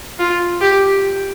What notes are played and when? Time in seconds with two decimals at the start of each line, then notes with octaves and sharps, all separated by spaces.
0.19 F4
0.61 G4